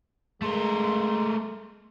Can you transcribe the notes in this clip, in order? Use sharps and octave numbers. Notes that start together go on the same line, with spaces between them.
G#3 A3 A#4 C6